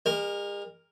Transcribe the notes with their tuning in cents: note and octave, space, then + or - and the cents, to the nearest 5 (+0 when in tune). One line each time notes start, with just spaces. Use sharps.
G#3 -45 A#4 +0